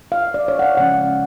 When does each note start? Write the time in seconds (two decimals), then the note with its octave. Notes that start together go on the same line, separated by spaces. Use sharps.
0.12 F5
0.34 D5
0.48 C#5
0.59 F#5
0.63 F5
0.77 C#3 F3 G#3 C#4 F#5